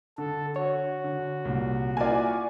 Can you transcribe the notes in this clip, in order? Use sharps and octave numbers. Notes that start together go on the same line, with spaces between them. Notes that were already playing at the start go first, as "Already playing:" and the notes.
D3 A4
F#4 C#5
D3
C2 A#2
A#3 E4 F4 D5 G#5